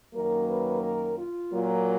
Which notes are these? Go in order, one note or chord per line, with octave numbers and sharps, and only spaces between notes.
F#2 D#3 F#3 A#3 A#4
B4
A#4
F4
A#2 F#3 A#3